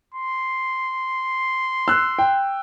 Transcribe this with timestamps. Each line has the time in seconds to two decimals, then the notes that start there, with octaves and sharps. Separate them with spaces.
0.14 C6
1.88 E6 F#6
2.19 G5